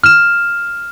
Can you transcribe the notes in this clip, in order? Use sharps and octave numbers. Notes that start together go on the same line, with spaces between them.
F6 E7